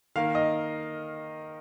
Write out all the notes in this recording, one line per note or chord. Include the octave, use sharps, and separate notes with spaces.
D#3 A#3 F5
D#5